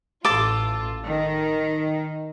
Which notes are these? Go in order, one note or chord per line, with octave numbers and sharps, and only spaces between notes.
A1 F4 A4 D6
D#3